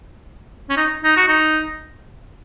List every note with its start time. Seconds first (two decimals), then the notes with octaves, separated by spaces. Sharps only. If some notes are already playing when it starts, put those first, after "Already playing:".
0.69 C#4
0.77 D#4
1.04 D#4
1.17 F#4
1.28 D#4